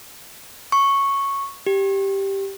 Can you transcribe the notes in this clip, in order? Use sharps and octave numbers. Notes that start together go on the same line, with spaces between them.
C#6
G4